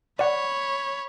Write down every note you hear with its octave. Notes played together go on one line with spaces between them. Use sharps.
C#5 D5 F#5 B5